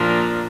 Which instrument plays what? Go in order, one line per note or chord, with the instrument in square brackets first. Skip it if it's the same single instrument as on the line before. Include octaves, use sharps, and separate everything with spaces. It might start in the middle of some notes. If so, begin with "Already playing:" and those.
Already playing: [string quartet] A#2 F3 A#3 D4